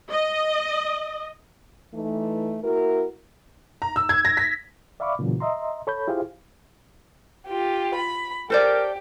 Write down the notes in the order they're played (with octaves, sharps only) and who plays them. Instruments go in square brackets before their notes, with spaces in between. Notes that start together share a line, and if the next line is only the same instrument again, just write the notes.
[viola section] D#5
[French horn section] E3 A3 D#4
A#3 E4 F#4 A#4
[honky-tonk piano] A#5
E6
G#6
A#6
B6
[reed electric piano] D5 E5 F5 B5 C#6 D6
A#2 C#3 E3 F#3
D#5 E5 A#5 C6
A4 C#5 B5 G6
E4 F4 G4 G#4 C5 F5
[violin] F4 G4
B5
[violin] G4 [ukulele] A4 C5 D5 [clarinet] A#4